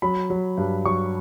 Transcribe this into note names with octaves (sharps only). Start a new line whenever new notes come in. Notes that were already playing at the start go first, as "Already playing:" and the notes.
F#3 B5
F#3
G2
F#3 C#6